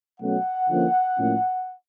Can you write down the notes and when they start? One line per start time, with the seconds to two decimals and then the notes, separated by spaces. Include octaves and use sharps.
0.19 B2 F#3 A3 C#4 F#5
0.68 D3 F3 A#3 C#4
1.17 A2 F3 A#3 C#4